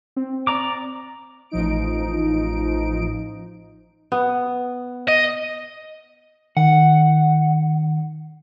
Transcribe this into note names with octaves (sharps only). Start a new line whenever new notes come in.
C4
D5 A#5 D6
A1 F3 D#4 D7
B3
D#5
D#3 F#5